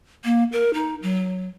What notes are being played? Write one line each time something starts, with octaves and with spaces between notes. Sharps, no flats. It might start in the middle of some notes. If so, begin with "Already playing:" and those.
A#3
A#4
D#4
F#3